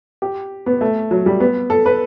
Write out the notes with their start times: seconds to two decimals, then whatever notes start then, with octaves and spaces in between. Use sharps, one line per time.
0.22 G4
0.66 B3
0.81 A3
1.11 F#3
1.26 G3
1.40 B3
1.70 A4
1.86 B4